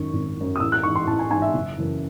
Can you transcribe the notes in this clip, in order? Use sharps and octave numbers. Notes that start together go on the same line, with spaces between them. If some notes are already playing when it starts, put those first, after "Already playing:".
Already playing: G#1 F#2 D#3 C#6
G#1
F#2 D#3
D#6
A1 E6
F#6
G#2 E3 C#6
C6
A1 A5
G#5
G#2 E3 G#5
E5
F#1
F#2 C#3 E3